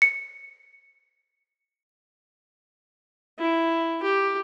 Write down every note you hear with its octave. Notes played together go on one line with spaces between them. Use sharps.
C#7
E4
G4